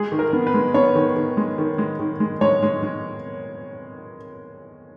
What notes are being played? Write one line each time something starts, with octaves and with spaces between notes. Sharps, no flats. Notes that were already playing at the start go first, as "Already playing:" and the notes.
Already playing: G#3 G#4
D#3
A#4
B3
B4
G#3
B3 C#5
D#3
D#3
G#3
D#3
G#3
D#3
G#3
G#3 C#5
G#3
G#3